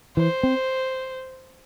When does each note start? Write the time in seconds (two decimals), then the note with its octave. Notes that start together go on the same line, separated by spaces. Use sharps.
0.17 E3 C5
0.43 C4